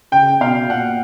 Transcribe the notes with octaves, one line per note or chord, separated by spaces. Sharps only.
C#3 G5
B2 F5
A#2 F#5